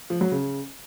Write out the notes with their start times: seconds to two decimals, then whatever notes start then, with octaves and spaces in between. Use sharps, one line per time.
0.10 F3
0.21 F#3
0.32 C#3